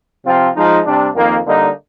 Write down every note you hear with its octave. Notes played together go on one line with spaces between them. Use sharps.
C3 F3 C4 F4
F3 G#3 D#4
C3 G3 D4
F2 D#3 A#3
D3 G3 A#3 D#4